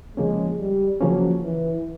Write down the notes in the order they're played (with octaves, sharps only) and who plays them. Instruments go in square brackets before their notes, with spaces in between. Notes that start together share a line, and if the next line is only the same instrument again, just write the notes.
[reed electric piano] C#3 F3 A#3 C#4 [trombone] G#3
[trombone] G3
[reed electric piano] C#3 F3 A#3 C#4 [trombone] F#3
[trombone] E3